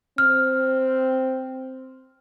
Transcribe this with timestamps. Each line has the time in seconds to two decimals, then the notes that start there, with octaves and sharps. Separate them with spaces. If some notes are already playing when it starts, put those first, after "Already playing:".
0.18 C4 F6